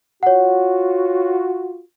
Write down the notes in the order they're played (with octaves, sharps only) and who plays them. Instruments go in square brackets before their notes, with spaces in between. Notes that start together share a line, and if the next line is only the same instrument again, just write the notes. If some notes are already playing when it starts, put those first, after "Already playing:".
[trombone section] F4 F#4 [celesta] C#5 F#5